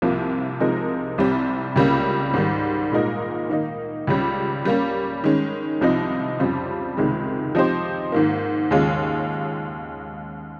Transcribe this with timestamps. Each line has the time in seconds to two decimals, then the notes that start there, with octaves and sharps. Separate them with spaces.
0.02 C2 C3 F3 A#3
0.60 C3 F3 G#3 D#4 A#4
1.18 C2 C3 G3 C4 G4
1.76 C#2 C#3 G3 A#3
2.34 G#2 D#3 G3
2.92 A#2 G#3 D#4 A#4
3.49 D#3 A#3 D#4
4.07 C#2 C#3 G3
4.65 G3 A#3 C#4
5.24 D#3 G#3 C#4
5.81 C2 C3 F3 C4 D#4
6.39 F2 C#3 G3 C4 F4
6.97 C#2 C3 D#3 G#3
7.55 F3 C4 D#4 G4 C5
8.12 G#2 D#3 A#3
8.71 D#2 C#3 G#3 C#4 F4